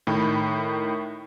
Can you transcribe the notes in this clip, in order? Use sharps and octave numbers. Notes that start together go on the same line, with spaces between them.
A2 D#3 G5 B5